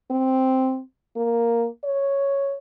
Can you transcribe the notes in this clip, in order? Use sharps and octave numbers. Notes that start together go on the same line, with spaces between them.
C4
A#3
C#5